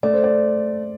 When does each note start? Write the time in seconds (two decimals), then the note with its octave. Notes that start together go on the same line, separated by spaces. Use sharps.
0.03 A3 D5
0.13 C5
0.24 D5